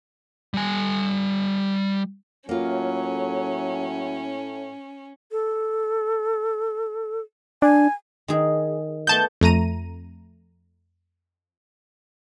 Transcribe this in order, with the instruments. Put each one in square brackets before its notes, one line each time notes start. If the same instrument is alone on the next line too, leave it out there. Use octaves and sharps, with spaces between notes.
[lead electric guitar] G3 G#5
[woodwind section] A2 [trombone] F#3 [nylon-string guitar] A#3 F4 [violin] C#4
[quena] A4
[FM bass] D4 [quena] G#5
[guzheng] D#3 G#4
[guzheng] A3 B3 [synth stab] A5 G6
[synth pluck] F2 A3 A#5 D#7